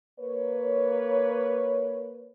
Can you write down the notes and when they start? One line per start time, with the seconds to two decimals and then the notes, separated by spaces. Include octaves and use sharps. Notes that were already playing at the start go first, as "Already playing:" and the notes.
0.20 A#3 B4 C#5